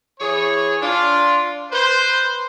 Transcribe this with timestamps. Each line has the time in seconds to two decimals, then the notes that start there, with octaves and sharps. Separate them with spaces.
0.19 E3 G#4 C#5
0.81 D4 F4
1.72 B4 C5